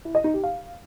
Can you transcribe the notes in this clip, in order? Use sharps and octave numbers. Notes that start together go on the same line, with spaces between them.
E4
D#5
D#4
G4
F5